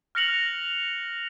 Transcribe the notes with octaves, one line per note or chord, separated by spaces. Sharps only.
F6 F#6 A#6 C#7 F7 F#7